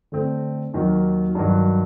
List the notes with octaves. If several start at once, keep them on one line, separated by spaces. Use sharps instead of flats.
D3 A3 C4
D#2 D#3 F#3
G2 D#3 F#3